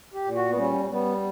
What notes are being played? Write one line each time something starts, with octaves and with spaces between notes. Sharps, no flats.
G4
A#2
F#4
B3
G3 C#4
G3 B3